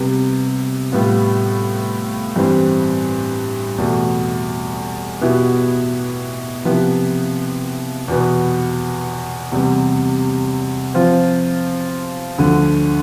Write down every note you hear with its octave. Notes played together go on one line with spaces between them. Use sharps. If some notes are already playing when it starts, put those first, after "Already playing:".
Already playing: C3 G3 B3
A2 G3 B3 F4
G2 E3 G3 C4
E2 B2 A3
B2 B3 E4 G4
C3 F3 B3 E4 G4
E2 B2 B3
E2 C3 G3
F3 C4 F4 C5
D2 D3 F3